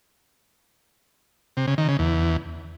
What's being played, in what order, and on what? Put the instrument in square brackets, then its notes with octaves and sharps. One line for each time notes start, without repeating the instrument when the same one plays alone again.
[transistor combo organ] C3
C#3
D#3
C#3
E2